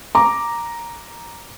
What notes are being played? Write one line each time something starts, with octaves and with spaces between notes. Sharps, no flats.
A#5 D6